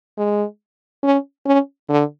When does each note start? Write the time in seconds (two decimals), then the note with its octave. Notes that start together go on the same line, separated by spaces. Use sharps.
0.18 G#3
1.03 C#4
1.46 C#4
1.89 D3